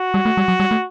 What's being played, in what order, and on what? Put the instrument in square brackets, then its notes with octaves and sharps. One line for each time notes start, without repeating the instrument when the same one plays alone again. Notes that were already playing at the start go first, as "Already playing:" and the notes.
Already playing: [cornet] F#4
[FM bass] G3
A3
G3
F#3
G3
A3